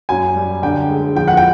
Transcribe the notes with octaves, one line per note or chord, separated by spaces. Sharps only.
F#2 G#5
G3
D3 G5
G#3
F3 G5
F#5
G5